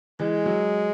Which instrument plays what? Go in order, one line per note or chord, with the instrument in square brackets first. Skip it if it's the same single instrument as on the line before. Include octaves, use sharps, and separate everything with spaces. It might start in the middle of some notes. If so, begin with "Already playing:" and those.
[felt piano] E3 [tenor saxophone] G#3
[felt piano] F#3